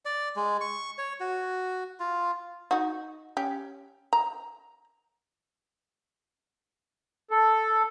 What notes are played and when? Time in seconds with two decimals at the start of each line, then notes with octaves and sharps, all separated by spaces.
0.05 D5
0.36 G#3
0.61 C#6
0.98 C#5
1.20 F#4
2.00 F4
2.71 D#4 F#4
3.37 C#4 G4
4.13 A#5
7.31 A4